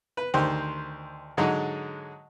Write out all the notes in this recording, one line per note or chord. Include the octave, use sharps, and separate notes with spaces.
B4
D2 D#3 G4 C5
G#2 D3 F#3 G#3